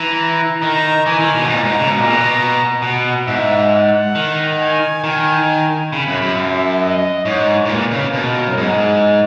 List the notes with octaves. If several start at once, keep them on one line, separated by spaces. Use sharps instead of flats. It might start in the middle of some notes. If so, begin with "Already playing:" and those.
Already playing: E3 A#5
D#3 A#5
E3 G#5
D#3
B2
G#2
A#2 A#5
G#2
C#3
B2 A#5
A#2
B2
B2 F#5
G#2 E5
F#5
D#3
G#5
D#3 G#5
C#3 B5
F#2
F#2
E5
D#5
G#2 C#5
G#2
A#2 B4
C#3
B2 A#4
F#2
G#2 G#4